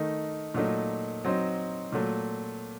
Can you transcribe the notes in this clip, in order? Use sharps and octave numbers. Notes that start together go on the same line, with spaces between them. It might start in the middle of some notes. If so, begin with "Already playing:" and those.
Already playing: D#3 A3 D#4
A#2 F#3 A3 D#4
F#3 C4 D#4
A#2 F#3 A3